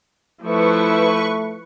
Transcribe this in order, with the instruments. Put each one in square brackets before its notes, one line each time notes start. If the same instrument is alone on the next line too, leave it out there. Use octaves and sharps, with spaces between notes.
[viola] F3 E4 [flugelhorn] A3 [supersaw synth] B4 C#6